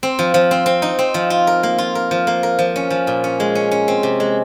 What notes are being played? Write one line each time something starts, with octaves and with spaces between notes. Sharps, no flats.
C4
F3
F3
C4
C4
D#4
C4
F3
F4
A#4
A#3
F4
A#4
F3
A#3
A#4
F3
C#4
F3
A#2
C#4
G#3
C#4
C#4
C4
C3
G#3